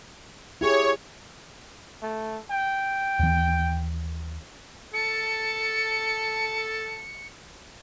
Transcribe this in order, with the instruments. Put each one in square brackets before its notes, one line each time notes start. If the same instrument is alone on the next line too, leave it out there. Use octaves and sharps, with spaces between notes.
[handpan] E4 G4 G#4 [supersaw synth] C#5
[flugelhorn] A3
G5
[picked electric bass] D#2 E3
[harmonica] A4 A5 [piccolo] C#7